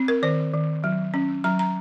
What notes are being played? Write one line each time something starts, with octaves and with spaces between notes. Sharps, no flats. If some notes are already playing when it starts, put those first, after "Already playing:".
Already playing: C4
A#4
D#3 C5
D#3
F#3
C#4
F#3 A#5
A#5